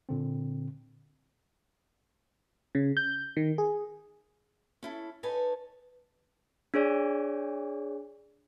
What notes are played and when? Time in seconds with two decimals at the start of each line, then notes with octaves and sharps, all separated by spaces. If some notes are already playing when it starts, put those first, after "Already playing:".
0.09 A#2 D3 C4
2.75 C#3
2.97 G6
3.37 D#3
3.58 G#4
4.83 C#4 E4 A4
5.23 D#4 A4 B4 C#5 G#5 A5
6.74 D4 G#4 C#5 D5